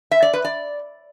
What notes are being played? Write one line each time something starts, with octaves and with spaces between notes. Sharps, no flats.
E5
D5
B4
D5